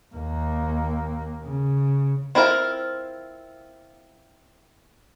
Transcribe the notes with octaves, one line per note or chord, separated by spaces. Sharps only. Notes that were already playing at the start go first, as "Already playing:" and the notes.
D#2 A#3
C#3
C4 E4 F4 A#4